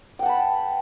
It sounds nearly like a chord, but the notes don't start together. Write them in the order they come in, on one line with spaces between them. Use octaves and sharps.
G5 F#5 A5 B5